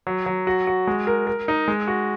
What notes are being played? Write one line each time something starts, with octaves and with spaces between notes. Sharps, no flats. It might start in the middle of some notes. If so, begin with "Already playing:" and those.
F#3
F#3
F#4
F#4
G#3
A#4
A#4
D#4
G#3
F#4